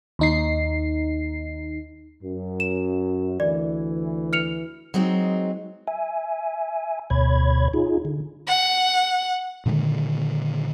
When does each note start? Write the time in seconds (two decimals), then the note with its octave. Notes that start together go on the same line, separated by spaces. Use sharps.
0.19 D#2 D#4 C7
2.22 F#2
2.60 E7
3.40 D2 E3 D5
4.33 F6 C#7 F7
4.94 F#3 G#3 C4 D#4
5.88 E5 G#5
7.10 D2 B2 C#5 B5 G#6
7.74 D#4 F4 G#4
8.05 D3
8.47 F#5
9.66 A#2 D3 D#3 G#3